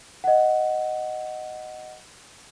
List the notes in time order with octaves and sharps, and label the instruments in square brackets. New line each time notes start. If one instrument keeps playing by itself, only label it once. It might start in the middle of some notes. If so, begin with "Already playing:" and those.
[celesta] D#5 F#5